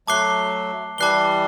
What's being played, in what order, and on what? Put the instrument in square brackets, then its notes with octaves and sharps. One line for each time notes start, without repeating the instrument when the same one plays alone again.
[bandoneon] F#3 A3 [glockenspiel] A5 D6 F#6 C7 G7
[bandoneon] E3 G3 [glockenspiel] A5 D6 F#6 C7 G7